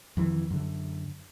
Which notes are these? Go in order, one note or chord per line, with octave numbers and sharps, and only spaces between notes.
F2 D#3 E3
F#2 D3